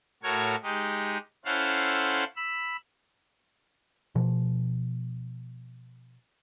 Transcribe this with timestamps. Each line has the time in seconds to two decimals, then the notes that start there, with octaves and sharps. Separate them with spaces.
0.23 A2 F#4 A4 A#4 C#5 G#6
0.63 G#3 D#4 G4
1.45 C#4 E4 A4 C5 F5 F#5
2.36 B5 E6
4.15 B2 F3